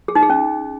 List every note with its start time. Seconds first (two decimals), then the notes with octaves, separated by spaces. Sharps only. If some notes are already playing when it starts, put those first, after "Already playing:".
0.08 G#4
0.15 D#4
0.23 G#4
0.30 C#4